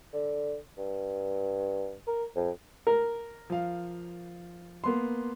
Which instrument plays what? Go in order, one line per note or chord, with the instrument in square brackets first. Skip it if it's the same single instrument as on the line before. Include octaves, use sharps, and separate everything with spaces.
[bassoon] D3
G2
A#4
F2
[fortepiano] A#4
[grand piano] F3 F5
A#3 B3 C6